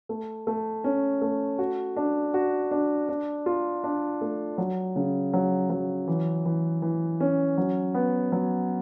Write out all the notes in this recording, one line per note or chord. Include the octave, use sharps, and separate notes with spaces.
A3
A3
C#4
A3
F#4
D4
F#4
D4
D4
F4
D4
A3
F#3
C#3
F#3
F#3
E3
E3
E3
C#4
F#3
B3
F#3